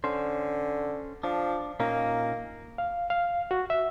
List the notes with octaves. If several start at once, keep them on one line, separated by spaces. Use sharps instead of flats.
D3 C#4 C5
F3 D4
A#2 A#3 C#4 D#4
F5
F5
F#4
E5